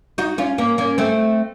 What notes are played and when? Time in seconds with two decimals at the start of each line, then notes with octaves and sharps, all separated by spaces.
0.18 D#4 F#4
0.38 C#4 F4
0.58 A#3 C#4
0.78 A#3 C#4
0.98 A3 C4